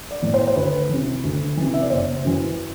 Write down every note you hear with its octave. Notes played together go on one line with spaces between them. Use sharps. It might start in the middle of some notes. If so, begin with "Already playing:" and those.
D5
A2 E3
C5
C5
D2 B4
C3 E3
D2
C3 E3
E5
D5
F#1 C5
F#2 E3